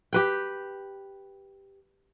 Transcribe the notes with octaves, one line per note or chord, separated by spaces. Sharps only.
G4 B4 G5